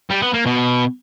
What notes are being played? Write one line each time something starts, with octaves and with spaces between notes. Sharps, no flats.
G3
B3
A#3
B2